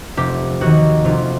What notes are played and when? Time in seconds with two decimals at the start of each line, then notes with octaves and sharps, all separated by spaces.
0.17 F1 G4
0.61 D#2 D#3 F#4
1.05 F1 F4